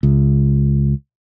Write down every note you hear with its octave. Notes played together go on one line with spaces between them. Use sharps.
C#2